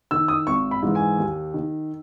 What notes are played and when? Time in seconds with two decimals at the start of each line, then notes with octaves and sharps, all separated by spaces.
0.11 D#3 E6
0.28 D#6
0.47 G#1 C#6
0.71 B5
0.82 G#2 E3
0.95 G#5
1.18 D#2
1.54 D#3